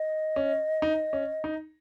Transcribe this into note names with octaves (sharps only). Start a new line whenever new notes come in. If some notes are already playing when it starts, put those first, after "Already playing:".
Already playing: D#5
C#4
D#4
C#4
D#4